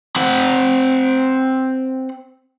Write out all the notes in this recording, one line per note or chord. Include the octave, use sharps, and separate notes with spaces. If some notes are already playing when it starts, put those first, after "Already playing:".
C4 F#5